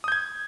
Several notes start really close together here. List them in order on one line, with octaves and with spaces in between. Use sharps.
D#6 G6 G#6